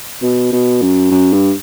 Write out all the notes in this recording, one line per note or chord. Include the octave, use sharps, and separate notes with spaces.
B2
B2
F#2
F#2
G2